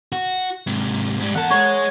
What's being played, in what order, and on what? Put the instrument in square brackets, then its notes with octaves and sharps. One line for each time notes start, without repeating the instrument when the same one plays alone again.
[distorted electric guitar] F#4
G#2 C3
G#2 G3
[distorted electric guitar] E2 A5 [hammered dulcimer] A#4 F#5
[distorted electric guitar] G#4 D#5 [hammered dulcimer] C#5